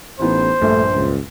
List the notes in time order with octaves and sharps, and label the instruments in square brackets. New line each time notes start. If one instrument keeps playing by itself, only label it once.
[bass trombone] A1 [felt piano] E3 B3 D#4 [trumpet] C5
[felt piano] A#1 G2 [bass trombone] A3
[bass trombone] C#2